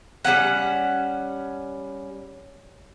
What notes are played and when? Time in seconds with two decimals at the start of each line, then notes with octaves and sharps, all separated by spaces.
0.25 G3 B3 C#4 F#5